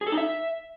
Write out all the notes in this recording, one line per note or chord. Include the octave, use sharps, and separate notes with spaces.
G#4
A4
D#4
E5